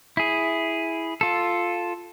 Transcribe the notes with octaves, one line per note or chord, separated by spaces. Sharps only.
E4 G#4
F4 A4